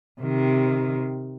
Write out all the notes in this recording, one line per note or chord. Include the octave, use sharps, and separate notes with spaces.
C3 D#3